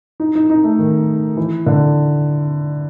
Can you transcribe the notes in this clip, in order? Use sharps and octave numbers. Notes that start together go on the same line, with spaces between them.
D#4
D#4
D#4
A3
D#3
E3
D3